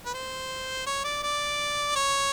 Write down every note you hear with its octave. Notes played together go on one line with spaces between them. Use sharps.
B4
C5
C#5
D5
D5
C#5